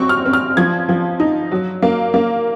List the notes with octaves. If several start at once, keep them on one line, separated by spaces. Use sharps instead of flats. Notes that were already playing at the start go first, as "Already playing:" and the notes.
Already playing: F#3 C4 C#6
F6
C4
F6
F3 G#6
F3
D#4
F#3
A#3
A#3